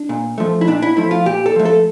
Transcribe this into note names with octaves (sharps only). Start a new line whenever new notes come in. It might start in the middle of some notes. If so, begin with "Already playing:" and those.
Already playing: D4
A#2
F3 A3
E4
A#2 D4
E4
F3 A3 E4
F4
A#2 G4
A4
F3 A3
A4